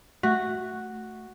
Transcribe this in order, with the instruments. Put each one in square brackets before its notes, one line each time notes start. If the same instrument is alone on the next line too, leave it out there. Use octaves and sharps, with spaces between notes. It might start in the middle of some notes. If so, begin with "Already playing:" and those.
[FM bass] A3 [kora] F#4